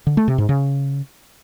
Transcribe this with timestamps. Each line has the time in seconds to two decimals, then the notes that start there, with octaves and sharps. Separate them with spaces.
0.07 D3
0.17 A3
0.28 C3
0.38 G#2
0.49 C#3